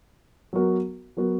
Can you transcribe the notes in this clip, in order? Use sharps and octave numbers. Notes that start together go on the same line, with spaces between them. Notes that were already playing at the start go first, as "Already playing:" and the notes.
F#3 B3 F#4 A#4
F#3 B3 F#4 A#4